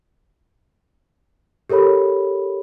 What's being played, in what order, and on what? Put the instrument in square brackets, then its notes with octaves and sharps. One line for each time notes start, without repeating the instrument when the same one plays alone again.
[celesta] G4 A4 A#4 C#5 B5